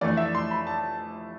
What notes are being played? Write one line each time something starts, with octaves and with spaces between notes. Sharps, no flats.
F1 F2 E3 A3 D4 D5
E5
C6
B5
A5